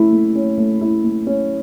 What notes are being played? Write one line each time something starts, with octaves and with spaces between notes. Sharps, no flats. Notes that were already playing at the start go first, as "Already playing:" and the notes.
Already playing: A3 C#4 E4
A3
C#4
A3
E4
A3
C#4